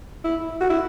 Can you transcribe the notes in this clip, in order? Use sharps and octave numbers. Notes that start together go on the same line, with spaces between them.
E4
F#4
E4